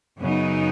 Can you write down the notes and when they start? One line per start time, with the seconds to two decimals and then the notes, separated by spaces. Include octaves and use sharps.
0.20 F#2 C#3 F#3 B3 D#4